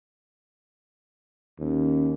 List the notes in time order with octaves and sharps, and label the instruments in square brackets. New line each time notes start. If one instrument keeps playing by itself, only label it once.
[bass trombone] D#2 [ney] C#4